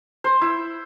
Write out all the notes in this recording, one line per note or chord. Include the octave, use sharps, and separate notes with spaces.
C5
E4